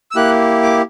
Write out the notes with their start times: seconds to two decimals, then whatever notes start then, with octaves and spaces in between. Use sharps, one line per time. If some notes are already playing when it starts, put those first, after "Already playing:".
0.11 E6
0.16 A#3 E4 G4 F#6
0.63 D6